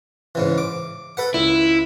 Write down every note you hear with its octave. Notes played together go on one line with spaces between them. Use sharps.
G#2 C#3 E3
D6
A4 B4 F#5
C#2 E4